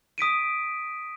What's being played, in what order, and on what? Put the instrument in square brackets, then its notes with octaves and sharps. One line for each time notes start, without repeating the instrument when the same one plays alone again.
[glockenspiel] D#6 B6 D7 D#7